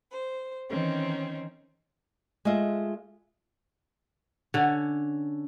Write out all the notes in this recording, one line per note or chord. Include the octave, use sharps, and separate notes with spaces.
C5
D#3 E3 C4 C#4 D#4
G#3 A3 F4 D#5 E5
D3 C#4